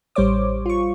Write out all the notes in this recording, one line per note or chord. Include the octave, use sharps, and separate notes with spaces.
A1 G3 C5 C#5 D6
F4 C#6